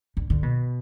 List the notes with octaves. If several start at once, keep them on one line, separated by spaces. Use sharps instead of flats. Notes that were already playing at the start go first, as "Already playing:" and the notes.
D3
D3
B2